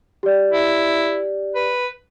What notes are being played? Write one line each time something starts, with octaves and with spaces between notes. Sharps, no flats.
G4 D5
E4
B4